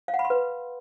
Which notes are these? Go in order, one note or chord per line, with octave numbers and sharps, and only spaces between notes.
F5
F#5
B5
C6
B4